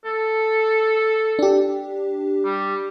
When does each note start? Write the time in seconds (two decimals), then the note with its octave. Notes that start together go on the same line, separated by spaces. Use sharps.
0.05 A4
1.39 D4 G4
2.45 G3